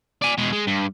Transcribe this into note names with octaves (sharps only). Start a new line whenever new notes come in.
D5 G#5
B2 G#3
G#3
G2